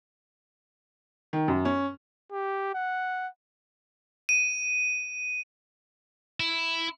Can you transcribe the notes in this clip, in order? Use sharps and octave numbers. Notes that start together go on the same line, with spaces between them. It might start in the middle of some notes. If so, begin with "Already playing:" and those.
D#3
F#2
C#4
G4
F#5
D#7
E4